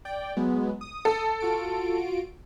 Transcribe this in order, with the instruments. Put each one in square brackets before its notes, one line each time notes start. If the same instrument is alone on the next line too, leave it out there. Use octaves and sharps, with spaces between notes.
[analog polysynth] D5 G5
F#3 G#3 B3
D#6
[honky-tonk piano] A4
[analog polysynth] F4 F#4 D7